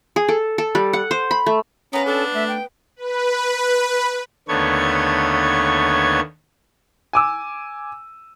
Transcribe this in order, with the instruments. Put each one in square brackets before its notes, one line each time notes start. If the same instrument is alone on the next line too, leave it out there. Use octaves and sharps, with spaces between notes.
[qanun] G#4
A4
A4
G3
F#5
C5
B5
A3
[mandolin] B3 B4 F5 [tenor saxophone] C#4 [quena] A#5
[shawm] D4 [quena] A4
[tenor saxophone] A3 [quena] E5
[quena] G5
[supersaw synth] B4
[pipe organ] D#2 D3 A3 B3 C#5 G#6
[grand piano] G#5 D6 E6